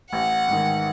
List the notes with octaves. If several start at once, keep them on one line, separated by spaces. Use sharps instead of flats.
A1 F#5
G#2 D#3